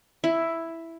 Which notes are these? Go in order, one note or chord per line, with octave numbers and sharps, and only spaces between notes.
E4